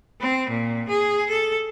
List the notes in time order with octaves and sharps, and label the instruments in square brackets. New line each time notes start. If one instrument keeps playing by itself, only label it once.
[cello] C4
A#2
G#4
A4